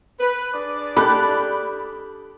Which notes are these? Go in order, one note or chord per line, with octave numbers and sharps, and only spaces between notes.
B4
D4 G#4 D5
G4 A4 B5 F#6